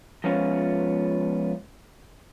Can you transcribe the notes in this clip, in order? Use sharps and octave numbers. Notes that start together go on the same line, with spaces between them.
F3 G#3 B3 C#4 F4